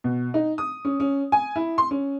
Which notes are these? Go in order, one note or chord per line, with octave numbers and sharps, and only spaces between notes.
B2
D#4
D#6
C#4
C#4
G#5
E4
C6
C#4